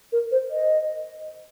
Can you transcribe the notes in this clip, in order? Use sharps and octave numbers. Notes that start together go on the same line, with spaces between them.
A#4
C5
D#5